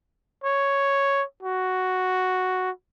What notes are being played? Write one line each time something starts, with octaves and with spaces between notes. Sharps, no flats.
C#5
F#4